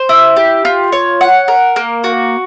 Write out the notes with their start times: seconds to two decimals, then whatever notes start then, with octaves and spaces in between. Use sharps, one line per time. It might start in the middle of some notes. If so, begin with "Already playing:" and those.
Already playing: C5
0.09 E4
0.36 G4
0.65 F4
0.92 C#5
1.21 F#5
1.48 A#4
1.76 A#3
2.04 F#4